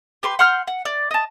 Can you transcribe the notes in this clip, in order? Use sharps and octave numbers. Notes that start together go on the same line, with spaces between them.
G4 B4 C6
F#5 C6 F6 G6
F#5
D5
D#5 A5